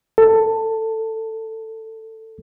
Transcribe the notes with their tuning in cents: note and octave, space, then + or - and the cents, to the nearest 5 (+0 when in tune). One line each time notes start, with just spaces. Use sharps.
A4 +15